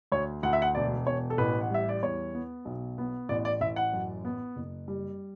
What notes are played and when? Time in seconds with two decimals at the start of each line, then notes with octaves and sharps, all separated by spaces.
0.12 D2 C#5
0.43 D2 F#5
0.53 E5
0.62 F#5
0.75 E1 D5
1.07 E1 C#5
1.30 A4
1.38 A1 B4
1.61 F#5
1.70 G3 E5
1.89 D5
2.03 E2 C#5
2.35 B3
2.65 B1
2.98 B3
3.29 A1 D5
3.45 D5
3.61 A1 E5
3.76 F#5
3.93 F#2
4.25 B3
4.56 F#1
4.88 G3